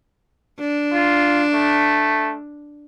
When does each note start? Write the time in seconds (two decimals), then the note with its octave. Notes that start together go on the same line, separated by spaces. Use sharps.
0.60 D4
0.93 F4
1.54 A3